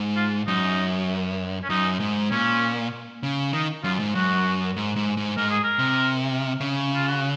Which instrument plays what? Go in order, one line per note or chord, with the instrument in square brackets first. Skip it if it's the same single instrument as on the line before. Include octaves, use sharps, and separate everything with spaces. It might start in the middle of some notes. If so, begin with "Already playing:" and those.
Already playing: [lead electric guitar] G#2
[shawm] F4
[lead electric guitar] F#2 [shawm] D#4
[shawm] C#4
[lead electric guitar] F#2 [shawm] D#4
[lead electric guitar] G#2
[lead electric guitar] A#2 [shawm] C#4
[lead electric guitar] C#3
[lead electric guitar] D#3 [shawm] D#4
[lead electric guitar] F#2 [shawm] F4
[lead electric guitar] G#2
[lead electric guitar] F#2 [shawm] F#4
[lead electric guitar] G#2
G#2
G#2
[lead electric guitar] G#2 [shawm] A#4
[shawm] G#4
A#4
[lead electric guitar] C3
C#3
[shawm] F4
F#4